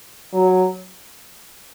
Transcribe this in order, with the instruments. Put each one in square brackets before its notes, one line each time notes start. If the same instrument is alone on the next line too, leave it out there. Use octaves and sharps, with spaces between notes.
[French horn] F#3